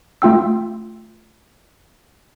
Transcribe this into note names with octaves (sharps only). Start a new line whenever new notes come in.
A3 F4 G5 E6